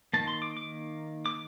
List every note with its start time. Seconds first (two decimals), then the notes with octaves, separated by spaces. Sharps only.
0.13 D#3 A#3 A5
0.28 C6
0.42 D6
0.57 D6
1.26 D6